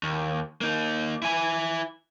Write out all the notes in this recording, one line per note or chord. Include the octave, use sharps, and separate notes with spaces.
D#2
A#3 D#4
E4 G#5